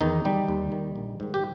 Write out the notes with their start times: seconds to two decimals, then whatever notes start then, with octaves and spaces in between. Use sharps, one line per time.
0.01 E2 D#3 D#4
0.24 D#3 G3 G4
0.48 D#2
0.72 D#3
0.96 A#1
1.20 G#2 D#3
1.34 G4